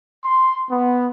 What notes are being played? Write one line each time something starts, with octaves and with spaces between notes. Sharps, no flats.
C6
B3